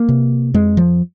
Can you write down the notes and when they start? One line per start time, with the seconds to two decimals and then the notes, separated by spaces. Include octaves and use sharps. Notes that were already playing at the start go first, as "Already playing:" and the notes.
Already playing: A#3
0.09 C3
0.54 F2 G#3
0.77 F3